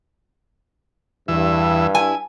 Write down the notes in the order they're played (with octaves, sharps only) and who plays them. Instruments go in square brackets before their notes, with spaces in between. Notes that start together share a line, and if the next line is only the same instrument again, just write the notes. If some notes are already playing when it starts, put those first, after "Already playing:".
[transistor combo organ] E2 E3 E5 [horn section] G2
[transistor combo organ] E4 [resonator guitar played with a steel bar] G#5